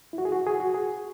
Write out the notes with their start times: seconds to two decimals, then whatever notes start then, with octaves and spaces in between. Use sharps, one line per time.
0.13 E4
0.18 F#4
0.25 G#4
0.32 F#4
0.46 G#4
0.60 F#4
0.74 G#4